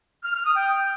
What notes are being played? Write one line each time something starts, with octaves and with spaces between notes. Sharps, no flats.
F6
F6
D#6
G5